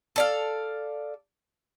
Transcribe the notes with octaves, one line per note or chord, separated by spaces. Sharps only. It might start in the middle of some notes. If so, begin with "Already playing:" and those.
A4 D5 F5